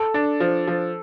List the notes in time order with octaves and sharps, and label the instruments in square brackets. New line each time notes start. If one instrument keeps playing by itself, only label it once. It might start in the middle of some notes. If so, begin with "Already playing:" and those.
Already playing: [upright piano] A4
[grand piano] D4
F3
F3